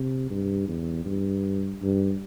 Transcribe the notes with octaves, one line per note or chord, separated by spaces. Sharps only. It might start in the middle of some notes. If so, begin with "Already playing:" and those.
Already playing: C3
G2
E2
G2
G2